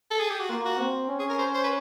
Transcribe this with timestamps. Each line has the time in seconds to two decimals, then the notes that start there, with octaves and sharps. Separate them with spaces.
0.11 A4
0.20 G#4
0.30 G4
0.40 F#4
0.49 A#3 F4
0.65 F#4
0.80 C4
1.09 C#4
1.19 G#4
1.30 A#4
1.38 C5
1.54 C5
1.64 B4